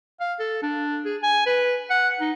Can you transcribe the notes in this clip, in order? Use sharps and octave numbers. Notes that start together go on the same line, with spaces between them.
F5
A4
D4
G#4
G#5
B4
F#5
D#4